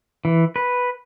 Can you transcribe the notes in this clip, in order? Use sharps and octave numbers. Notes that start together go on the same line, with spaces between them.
E3
B4